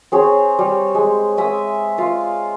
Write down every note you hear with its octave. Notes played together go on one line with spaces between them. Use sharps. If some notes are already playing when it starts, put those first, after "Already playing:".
C4 G#4 C#5
G3
G#3
G#3 E5 D#6
F4 F5